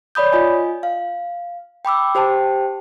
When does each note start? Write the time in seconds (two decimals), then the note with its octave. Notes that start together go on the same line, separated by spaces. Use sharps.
0.15 C#5 D5 B5 D#6 G6
0.32 F4 D#5 G#5
0.83 F5
1.85 G5 B5 D6 E6
2.15 G4 C5 G5 A5